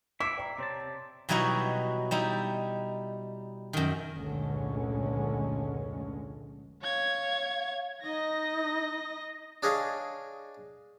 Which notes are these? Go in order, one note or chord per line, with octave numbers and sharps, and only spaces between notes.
E4 E5 D6 C7 D7
D5 G5 A#5
C3 C4 C#5 A5 A#5 C6
B2 F#3 G3 D#4 E4 F#4
G3 D#4 E4
F#2 D#3
F1 C#2 A#2 D3 G#3 C#4
C#5 F5 G#6
D#4 D#5 A#6
D4 G#4 C#5 D#5 F5